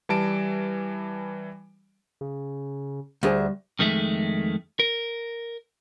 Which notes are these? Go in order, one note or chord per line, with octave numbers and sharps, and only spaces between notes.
E3 G3 A5 D7
C#3
D2 G3 D4 G#4 C5
F2 D#3 G#3 A3 E5
A#4